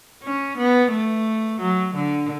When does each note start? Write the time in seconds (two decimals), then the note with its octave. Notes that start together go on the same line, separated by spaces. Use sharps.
0.23 C#4
0.57 B3
0.91 A3
1.60 F#3
1.95 D3